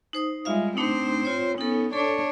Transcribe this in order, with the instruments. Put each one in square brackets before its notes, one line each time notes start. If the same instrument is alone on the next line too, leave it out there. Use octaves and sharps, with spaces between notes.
[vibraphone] D#4 C5 D#6
[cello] G3 G#3 [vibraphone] F4 E5 F5
[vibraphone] A3 D4 D#4 [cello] C4 C5
[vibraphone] F4 C#5
[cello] B3 C#4 [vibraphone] D#4 A4
[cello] D4 C#5 [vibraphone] A4